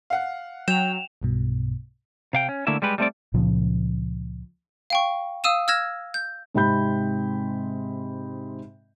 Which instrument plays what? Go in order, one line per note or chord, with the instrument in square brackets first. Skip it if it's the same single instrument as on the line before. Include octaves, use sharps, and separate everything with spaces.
[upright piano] F5 F#5
[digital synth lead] F#3 [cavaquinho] G5 [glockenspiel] E7 F7
[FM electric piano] B1 G2 B2
[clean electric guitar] C3 F5 G5
C#4
D3 A3 A#3 E4 E5
G3 G#3 G4 B4
G3 A3 C4 D5
[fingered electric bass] C#2 A#2 C#3 F3
[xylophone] F5 G5 C#6
F5 D#6 E6 D#7 E7
E6 F6 G#6 A#6 E7
G6
[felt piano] G#2 C3 C4 B5 G6